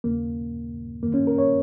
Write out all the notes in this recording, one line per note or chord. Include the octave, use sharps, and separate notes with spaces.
D#2 C#3 A#3
F#2 D#3 A#3
C#4
A#4
C#5